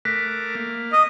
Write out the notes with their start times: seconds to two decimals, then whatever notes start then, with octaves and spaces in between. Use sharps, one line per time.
0.05 A3 A#4 D6 F#6 B6
0.55 A#3
0.93 D#5